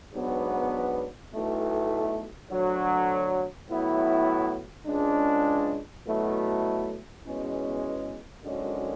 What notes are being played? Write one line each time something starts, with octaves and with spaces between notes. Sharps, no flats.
G#2 F#3 B3 D4
B1 B2 A3 E4
D2 D3 F#3
A2 F#3 B3 E4
C#2 C#3 G#3 D4
B2 F#3 A3 E4
E2 B2 G#3 C#4
G#1 F#2 D3 G#3 C#4